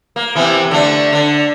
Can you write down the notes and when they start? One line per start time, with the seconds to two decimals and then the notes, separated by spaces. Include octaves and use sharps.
0.16 A#3
0.35 C3 E3 B3
0.71 D3 A3
1.13 D3